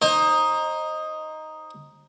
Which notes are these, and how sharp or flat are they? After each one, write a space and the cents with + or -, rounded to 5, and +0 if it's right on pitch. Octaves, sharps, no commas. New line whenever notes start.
D#4 +0 C5 +35